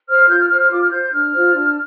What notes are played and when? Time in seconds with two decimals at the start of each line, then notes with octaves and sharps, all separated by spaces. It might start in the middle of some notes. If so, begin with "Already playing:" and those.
0.09 C5 F6
0.29 F4 G6
0.40 F6
0.50 C5 F6
0.61 F6
0.71 F4 D6
0.81 F6
0.91 C5 G6
1.02 G6
1.12 D4 F6
1.33 F4 C5
1.54 D4